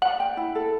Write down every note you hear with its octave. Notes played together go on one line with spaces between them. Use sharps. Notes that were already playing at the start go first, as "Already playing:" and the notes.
D5 F#5
G5
E4
A4